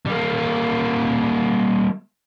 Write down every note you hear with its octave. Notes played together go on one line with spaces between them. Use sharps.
G3 A#3